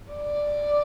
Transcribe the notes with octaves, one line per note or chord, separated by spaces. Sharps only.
D5